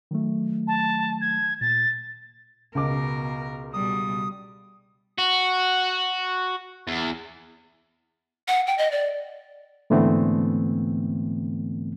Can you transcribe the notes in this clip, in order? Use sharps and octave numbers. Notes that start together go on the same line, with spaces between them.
D#3 F#3 A3
A5
G#6
A#2 A6
C#2 B2 A#4 D6
B2 G3 D#6
F#4
E2
F#5
G5
D#5
D5
G#2 D3 E3 A3 B3 C4